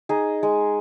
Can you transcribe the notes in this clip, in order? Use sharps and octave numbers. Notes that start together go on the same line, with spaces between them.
D#4 G#4
G#3